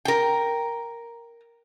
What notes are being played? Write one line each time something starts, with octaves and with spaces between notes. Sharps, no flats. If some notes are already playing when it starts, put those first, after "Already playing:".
A#4 G5